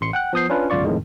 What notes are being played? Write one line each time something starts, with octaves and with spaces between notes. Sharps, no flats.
A1 C6 C#7
F#5 G5 F#6
F3 B3 D#6 G6 C7
C#4 D4 F4 B4
G1 C#2 F#2 F4 D5 C#6
F2 A2 D#3 G#3